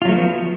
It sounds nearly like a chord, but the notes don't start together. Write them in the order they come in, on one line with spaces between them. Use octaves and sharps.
F4 F#3 A3 F3 B3